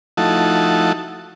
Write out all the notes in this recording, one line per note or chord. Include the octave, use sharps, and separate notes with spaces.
F3 A3 D#4 E4 F#4 A5